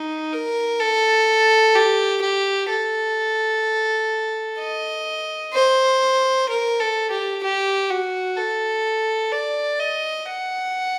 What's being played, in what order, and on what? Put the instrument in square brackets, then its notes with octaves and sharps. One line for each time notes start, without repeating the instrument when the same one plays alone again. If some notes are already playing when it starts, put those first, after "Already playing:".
Already playing: [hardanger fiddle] D#4
A#4
A4
G4
G4
A4
D#5
C5
A#4
A4
G4
G4
F#4
A4
D5
D#5
F#5